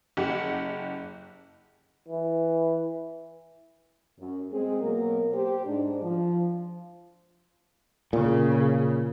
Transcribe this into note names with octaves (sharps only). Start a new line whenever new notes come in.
F#1 G4 F#5
E3
F#2
G#3 C4 G#4
B2 F#3 A#3 A#4
G4 C5
G#2 D4
F3
A#2 C#3